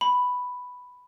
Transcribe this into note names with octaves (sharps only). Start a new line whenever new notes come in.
B5